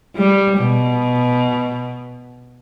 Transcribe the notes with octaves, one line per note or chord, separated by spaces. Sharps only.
G3
B2